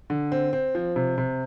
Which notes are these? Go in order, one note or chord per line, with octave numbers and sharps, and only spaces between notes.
D3
C4
C4
F3
C3
C3